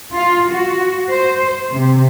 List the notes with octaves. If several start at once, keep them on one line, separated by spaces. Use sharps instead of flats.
F4
F#4
C5
C3